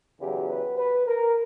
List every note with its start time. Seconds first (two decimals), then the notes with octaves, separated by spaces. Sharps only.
0.21 E2 C#3 F#3 G4
0.50 B4
0.78 B4
1.07 A#4